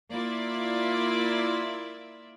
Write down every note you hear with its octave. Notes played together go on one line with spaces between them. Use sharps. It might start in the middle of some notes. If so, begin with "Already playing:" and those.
A#3 E4 F4 D5 E5